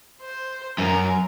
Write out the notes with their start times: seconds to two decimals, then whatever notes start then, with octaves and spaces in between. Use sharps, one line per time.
0.22 C5
0.78 F#2 A#4